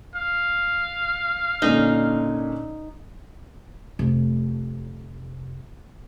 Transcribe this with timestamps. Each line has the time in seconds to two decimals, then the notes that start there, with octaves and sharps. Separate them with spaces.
0.15 F5
1.62 A#2 D3 C#4 D#4
3.99 F1 C3